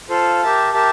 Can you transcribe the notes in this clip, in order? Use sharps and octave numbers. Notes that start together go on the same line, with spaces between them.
F4 A4 C5 F5
G4 A#4 E5 A5
G4 A#4 E5 A5